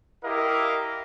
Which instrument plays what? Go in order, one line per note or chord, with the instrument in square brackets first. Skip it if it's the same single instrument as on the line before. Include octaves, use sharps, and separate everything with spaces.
[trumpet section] E4 G4 A#4 D#5 F5